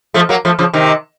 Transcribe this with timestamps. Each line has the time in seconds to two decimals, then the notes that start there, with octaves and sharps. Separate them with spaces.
0.14 F3 A3
0.29 F#3 A#3
0.45 F3 A3
0.59 C#3 F3
0.73 C3 D#3